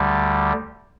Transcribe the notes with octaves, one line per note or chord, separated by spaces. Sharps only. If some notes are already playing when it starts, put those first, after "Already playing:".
Already playing: D2 D3 G3